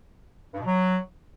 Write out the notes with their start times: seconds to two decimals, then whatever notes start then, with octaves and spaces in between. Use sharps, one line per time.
0.54 G2
0.60 B2
0.65 F#3